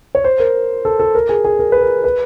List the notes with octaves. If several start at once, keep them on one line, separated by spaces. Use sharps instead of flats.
C#5
C5
A#4
A4
A4
A#4
G#4
G#4
A#4
B4
A#4
B4